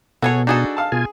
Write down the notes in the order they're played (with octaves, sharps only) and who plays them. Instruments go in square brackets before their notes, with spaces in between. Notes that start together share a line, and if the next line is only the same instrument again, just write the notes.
[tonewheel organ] B2 [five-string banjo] F#4 G#4 C#5 [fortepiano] A4
[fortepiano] D4 F#4 D#6 [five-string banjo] D#4 G#4 A4
[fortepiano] F5 A5
[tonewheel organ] B2 F4 G#5 [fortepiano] G#4